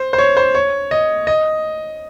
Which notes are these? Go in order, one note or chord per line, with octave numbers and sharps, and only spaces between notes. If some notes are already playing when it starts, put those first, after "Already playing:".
Already playing: C5
C5
C#5
C5
C#5
D#5
D#5